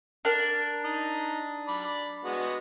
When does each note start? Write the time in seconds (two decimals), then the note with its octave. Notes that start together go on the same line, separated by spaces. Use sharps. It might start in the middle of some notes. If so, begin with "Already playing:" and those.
0.25 D4 A#4
0.84 D#4
1.68 D5 B5
2.24 G#3 B3 F#4